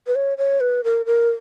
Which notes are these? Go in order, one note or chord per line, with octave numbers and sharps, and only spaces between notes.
B4
C#5
C#5
B4
A#4
A#4